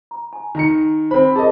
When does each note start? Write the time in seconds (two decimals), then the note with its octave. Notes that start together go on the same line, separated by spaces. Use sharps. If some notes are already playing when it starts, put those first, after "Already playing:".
0.11 A#5
0.33 G#5
0.55 D#3 A#5 C#7
1.11 C4 C5 B5
1.36 G#4 A#4 D#5 A5